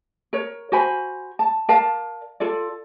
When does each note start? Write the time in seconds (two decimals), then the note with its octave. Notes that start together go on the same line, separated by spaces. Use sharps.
0.33 A#4 C#5
0.72 F#4 C5 G#5 B5
1.39 A5
1.69 A#4 D5 F5 A5
2.40 F4 A4 D5